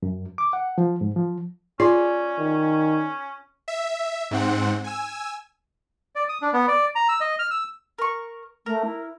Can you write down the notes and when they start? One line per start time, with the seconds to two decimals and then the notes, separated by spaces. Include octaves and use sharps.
0.03 F#2
0.38 D6
0.53 F#5
0.78 F3
1.01 G#2
1.16 F3
1.80 C#4 F4 G#4 D5
2.38 D#3
3.68 E5
4.31 G#2 C4 F#5
4.84 G#5 E6
6.16 D5
6.29 D#6
6.42 D4
6.53 B3
6.68 D5
6.95 A#5
7.09 E6
7.21 D#5
7.39 F6
7.51 E6
7.99 A#4 C#6
8.66 A3 A#4
8.85 E4